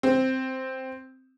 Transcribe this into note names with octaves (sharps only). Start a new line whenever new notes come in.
C4